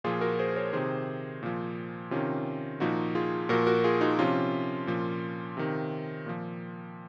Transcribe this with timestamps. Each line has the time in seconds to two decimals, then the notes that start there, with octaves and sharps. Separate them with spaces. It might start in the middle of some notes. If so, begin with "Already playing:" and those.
0.04 A#2 F3 F4 G#4
0.21 F#4 A#4
0.39 G#4 C5
0.56 A#4 C#5
0.73 C3 D#3 G#4 C5
1.43 A#2 F3
2.11 C3 D#3 C#4 F4
2.80 A#2 F3 D#4 F#4
3.15 F4 G#4
3.49 A#2 F3 F#4 A#4
3.67 F#4 A#4
3.84 F4 G#4
4.01 D#4 F#4
4.19 C3 F3 C#4 F4
4.87 A#2 F3
5.57 C3 D#3
6.26 A#2 F3